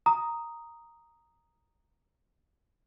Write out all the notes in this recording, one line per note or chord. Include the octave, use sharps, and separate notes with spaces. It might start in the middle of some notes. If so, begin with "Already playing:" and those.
A#5 D#6